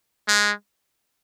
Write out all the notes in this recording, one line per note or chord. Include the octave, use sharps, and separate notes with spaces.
G#3